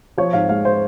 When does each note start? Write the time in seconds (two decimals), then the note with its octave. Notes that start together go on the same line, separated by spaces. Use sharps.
0.18 F3 C#5
0.33 G#2 F5
0.49 G#3 F5
0.65 C5